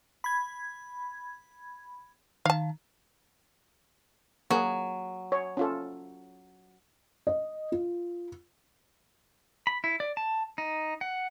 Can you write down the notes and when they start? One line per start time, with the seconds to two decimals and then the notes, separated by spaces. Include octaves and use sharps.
0.24 B5 G#6
2.45 D#3 F5 A5
4.50 F#3 A#3 G#4
5.32 C#5
5.57 C#4 F4 A4
7.27 D#5
7.72 F4
9.67 B5
9.84 E4
10.00 D5
10.17 A5
10.58 D#4
11.01 F#5